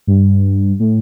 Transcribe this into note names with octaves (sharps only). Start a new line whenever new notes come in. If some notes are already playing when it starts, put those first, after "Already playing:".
G2
A2